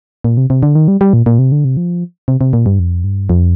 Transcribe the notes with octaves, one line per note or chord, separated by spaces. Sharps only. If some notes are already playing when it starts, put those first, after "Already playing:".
A#2
C3
C3
D3
D#3
G3
G3
A#2
A#2
C3
D3
C3
F3
C3
C3
A#2
G2
F2
G2
F2